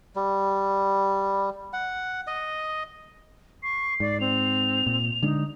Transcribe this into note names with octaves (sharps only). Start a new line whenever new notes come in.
G3
F#5
D#5
C#6 C7
G#2 D5
C4 F7
A#2
D3 G#3 D4 D#4